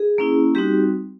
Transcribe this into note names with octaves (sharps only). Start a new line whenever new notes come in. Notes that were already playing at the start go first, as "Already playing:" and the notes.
Already playing: G#4
A#3 C#4 E4
G3 C4 D#4 F#4 G4